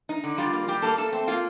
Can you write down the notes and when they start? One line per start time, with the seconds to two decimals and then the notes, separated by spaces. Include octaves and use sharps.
0.09 D#4
0.24 D3
0.38 G3 F4
0.53 A#3
0.68 G3 G4
0.82 A#3 A4
0.98 A3 A4
1.13 C4
1.27 A#3 F4